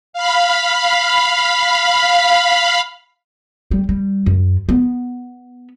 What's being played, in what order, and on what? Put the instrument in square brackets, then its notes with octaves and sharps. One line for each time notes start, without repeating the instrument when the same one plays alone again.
[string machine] F5 B5
[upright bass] G3
G3
F#2
B3